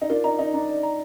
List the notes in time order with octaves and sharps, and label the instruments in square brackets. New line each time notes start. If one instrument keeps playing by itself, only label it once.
[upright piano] D#4
[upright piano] D4 F4 [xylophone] A#4
[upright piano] D#4 [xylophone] A#5
[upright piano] D#4 [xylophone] D5
[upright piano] D4 [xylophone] A#5
[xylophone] D5
A#5